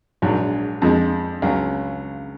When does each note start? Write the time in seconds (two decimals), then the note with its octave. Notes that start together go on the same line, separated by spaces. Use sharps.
0.22 A#1 G#2 F#3
0.82 F2 F3 G#3
1.42 C#2 C#3 F#3